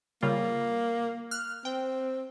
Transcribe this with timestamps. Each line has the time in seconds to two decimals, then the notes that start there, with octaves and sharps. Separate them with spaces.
0.23 C#3 G3 A#3 F4
1.31 F6 F#6
1.65 C4 G5